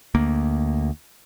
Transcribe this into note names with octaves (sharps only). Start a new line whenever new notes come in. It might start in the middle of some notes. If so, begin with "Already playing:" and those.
D2 A#3